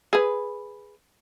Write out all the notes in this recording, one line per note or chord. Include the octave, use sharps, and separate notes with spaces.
G#4 B4